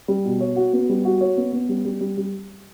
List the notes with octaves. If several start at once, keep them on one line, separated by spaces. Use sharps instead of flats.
G3
B2
C#5
F#4
B3
G3
F#4
C#5
B3
B3
G3
G3
G3
G3